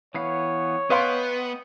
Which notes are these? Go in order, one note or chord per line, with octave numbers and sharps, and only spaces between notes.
E3 B3 C#5 F5
B3 B4 D#5 F5 G5 C6